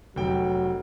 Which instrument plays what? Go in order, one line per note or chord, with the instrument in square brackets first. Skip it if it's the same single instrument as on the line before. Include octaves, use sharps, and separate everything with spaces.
[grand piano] F1 G5 [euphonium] F#3